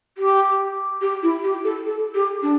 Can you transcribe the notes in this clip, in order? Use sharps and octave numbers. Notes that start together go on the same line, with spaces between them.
G4
G4
E4
G4
A4
A4
G4
D4